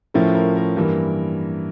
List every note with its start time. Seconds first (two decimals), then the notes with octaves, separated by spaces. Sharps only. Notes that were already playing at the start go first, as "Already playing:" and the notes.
0.14 A2 F3 C#4 E4 A#4
0.35 A#4
0.55 A#4
0.76 G2 E3 A#3